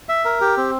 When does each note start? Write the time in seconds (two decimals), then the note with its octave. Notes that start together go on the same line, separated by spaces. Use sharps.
0.09 E5
0.25 A#4
0.41 G4
0.57 C4